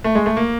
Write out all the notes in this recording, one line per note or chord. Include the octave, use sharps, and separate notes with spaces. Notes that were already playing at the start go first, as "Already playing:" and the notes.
A3
G#3
A3
A#3